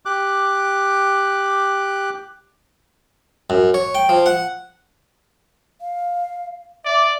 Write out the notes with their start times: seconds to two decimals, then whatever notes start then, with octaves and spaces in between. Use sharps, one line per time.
0.06 G4 D6 F#6
3.50 F#2
3.74 C#5
3.95 G5
4.09 F3
4.26 F#5
5.81 F5
6.85 D5 E5